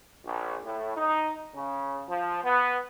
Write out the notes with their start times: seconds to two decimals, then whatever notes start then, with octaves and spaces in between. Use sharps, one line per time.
0.25 A#1
0.64 A2
0.96 D#4
1.54 C#3
2.08 F3
2.43 B3